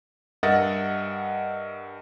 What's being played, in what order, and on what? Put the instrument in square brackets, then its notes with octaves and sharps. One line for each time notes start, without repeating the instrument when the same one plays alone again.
[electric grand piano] G2 A#4 D#5 E5 F#5 A6